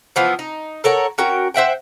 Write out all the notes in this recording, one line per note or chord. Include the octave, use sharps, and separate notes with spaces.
E3 F3 B3
D#4
A4 A#4 C#5 F#5
C#4 F#4 A#4 G5
C5 E5 F#5 G5